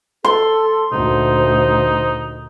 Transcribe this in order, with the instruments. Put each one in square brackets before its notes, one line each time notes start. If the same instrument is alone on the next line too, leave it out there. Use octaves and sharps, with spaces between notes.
[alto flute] A4 [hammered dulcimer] C6
[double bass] D2 A#2 [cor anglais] D#4 [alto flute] C5